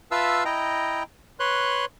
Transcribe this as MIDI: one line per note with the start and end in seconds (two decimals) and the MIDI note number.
0.11 0.44 65
0.11 0.44 71
0.11 0.44 76
0.11 0.44 77
0.11 0.44 81
0.11 0.44 88
0.45 1.03 64
0.45 1.03 75
0.45 1.03 79
0.45 1.03 82
1.40 1.85 71
1.40 1.85 73
1.40 1.85 84
1.40 1.85 90